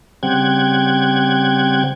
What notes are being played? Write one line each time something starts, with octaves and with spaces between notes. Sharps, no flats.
C#3 G3 C4 F#5 G5 G#6